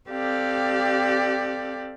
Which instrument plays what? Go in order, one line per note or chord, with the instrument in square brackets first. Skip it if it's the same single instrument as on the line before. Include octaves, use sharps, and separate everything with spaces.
[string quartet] C4 G4 A4 D5 F5